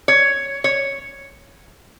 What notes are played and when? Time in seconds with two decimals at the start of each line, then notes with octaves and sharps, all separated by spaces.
0.08 C#5
0.64 C#5